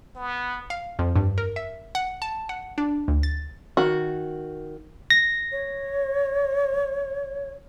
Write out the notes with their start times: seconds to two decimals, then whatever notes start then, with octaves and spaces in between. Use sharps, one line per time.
0.16 B3
0.70 F5
0.99 F2
1.16 G2
1.38 A#4
1.56 E5
1.95 F#5
2.22 A5
2.49 F#5
2.78 D4
3.08 D2
3.23 A6
3.77 D#3 F#4
5.10 A#6
5.52 C#5